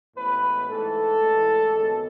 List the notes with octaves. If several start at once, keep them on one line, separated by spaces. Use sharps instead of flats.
A1 A2 G#3 B3 B4
G#2 E3 A3 A4
A1 A2 E3 G#3
G#1 F#2 C#3 G#3 B3